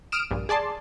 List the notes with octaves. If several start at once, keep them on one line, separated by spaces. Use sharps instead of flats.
D#6 F6 D7 E7
A#1 G2 A#2
G#4 D5 A5 C6